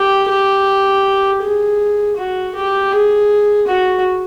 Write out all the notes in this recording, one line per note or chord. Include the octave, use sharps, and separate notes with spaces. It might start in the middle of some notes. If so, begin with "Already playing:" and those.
Already playing: G4
G4
G#4
F#4
G4
G#4
F#4